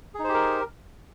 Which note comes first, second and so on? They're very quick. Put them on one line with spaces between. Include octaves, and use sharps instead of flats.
G#4 D#4 C5 G4 A#4